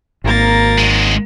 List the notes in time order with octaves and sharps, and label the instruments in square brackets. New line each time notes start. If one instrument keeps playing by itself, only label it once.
[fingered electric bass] G#1 [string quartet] A#3 A#4 A6
[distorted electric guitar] F#3 G#3